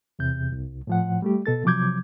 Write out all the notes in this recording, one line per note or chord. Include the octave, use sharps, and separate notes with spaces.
E2 C3 G6
C2
A2 F3 F#5
G3 A3 G4
B2 A4 A6
C3 F3 F#3 D6 G6 G#6